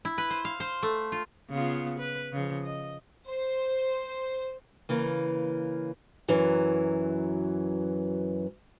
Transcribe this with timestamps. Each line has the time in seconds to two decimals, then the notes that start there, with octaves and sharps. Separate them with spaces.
0.05 E4
0.18 B4
0.30 C5
0.45 F5
0.60 C5
0.83 A3
1.12 F4
1.50 C#3 B3 F4
1.99 B4
2.33 C#3 F3
2.64 D#5
3.27 C5
4.89 C#3 E3 A#3
6.28 F#2 E3 F#3